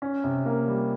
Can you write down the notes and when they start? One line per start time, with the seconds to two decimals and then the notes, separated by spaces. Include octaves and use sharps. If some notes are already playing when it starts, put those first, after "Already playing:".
0.02 C#4
0.24 C3
0.46 A#3
0.68 G3